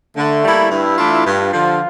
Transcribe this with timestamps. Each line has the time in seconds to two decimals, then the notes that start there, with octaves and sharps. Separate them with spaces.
0.17 D3 A3
0.44 G3 A#3 E4
0.71 G2 E4
0.98 E3 A3 D4 F4
1.26 G2 F4
1.53 D3 F3